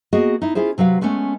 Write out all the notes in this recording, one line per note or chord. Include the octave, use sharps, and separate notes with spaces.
A#3 B3 F#4 G#4 D#5
D#4 E4
C#4 E4 F4 G#4 C5
C3 F#3 B4 F5
G#3 A3 B3 C#4